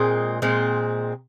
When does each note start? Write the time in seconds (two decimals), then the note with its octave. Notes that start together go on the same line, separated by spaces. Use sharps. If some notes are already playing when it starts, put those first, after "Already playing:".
Already playing: A#2 G#3 C4
0.42 A#2 G#3 C4